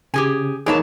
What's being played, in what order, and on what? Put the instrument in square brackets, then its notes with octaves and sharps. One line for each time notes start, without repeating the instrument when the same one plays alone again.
[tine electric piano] C#3 [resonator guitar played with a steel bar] G4 G#4 G#5
[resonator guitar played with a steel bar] E3 C#5 A5 [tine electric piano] A#3 D#4 G#4